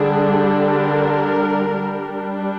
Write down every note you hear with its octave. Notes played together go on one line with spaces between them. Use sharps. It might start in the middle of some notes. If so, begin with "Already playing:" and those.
Already playing: D3 G3 D4 G#4
A#4
G3 D4